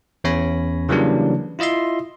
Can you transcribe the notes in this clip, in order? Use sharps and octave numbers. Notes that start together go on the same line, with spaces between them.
E2 C#4 C#5 G#5 B5 A#6
C#3 E3 F#3 G3 A#3 D4
E4 F4 D#5 E5 C6